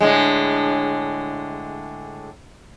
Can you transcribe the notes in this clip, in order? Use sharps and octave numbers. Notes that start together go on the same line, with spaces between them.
A2 D3 G#3